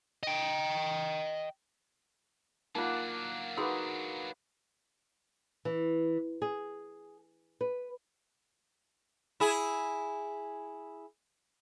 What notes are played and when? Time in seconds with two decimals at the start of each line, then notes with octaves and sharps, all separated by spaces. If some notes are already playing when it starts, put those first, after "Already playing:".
0.23 D#5 G5
2.75 F#3 A#3 D4 D#4 F4 F#5
3.57 D#4 F#4 G#4 B4 C6 E6
5.65 E3
6.42 G#4
7.61 B4
9.40 E4 G#4